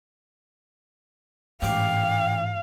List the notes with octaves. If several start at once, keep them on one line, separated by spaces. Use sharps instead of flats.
A1 G#2 D5 F5 G5 D6